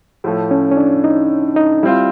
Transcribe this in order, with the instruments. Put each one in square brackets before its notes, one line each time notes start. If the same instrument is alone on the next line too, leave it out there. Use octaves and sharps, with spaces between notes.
[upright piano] A2 F3 A3
[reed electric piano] C#4
C#4
D4
D#4
D#4
[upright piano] G3 C4 F4 [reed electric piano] E4